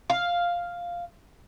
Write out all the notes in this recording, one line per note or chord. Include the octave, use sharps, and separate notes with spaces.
F5